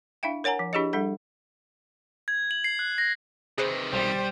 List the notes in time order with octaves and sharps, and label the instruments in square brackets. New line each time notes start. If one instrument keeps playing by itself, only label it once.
[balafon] D4 E4 E5 F5 G5
A#4 C#5 F#5 G#5 A#5
F3
D4 E4 G4 G#4 C#5 D#5
G3 D4 A4 F#5
[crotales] G#6
F#7
C7
F#6
A#6
[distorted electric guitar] C3 D#3 [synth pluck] G#4 B4 C5
[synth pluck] B1 [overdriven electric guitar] G3 [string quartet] C5